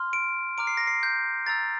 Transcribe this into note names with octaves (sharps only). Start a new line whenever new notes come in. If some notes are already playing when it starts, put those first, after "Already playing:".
Already playing: C6 F6
D7
A#5 D6 F6 D7
C7
A#6
C7
G6
A#5 E6 G6 A6